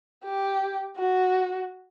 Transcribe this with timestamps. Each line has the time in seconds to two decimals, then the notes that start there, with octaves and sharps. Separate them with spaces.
0.24 G4
0.97 F#4